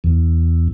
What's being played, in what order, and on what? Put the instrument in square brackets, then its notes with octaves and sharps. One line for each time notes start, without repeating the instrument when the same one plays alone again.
[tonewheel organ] E2